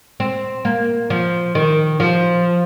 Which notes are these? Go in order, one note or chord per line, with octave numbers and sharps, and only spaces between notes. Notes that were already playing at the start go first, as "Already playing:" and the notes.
C4
A#3
F3
D#3
F3